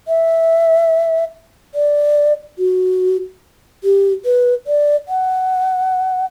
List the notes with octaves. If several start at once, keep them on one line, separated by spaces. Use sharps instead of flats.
E5
D5
F#4
G4
B4
D5
F#5